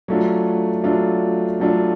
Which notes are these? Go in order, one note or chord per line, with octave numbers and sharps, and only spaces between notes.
F#3 A3 D4 F4
F#3 A3 D4 F4
F#3 A3 D4 F4